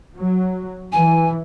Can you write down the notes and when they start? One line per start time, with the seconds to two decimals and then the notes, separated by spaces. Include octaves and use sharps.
0.17 F#3
0.92 E3 G#5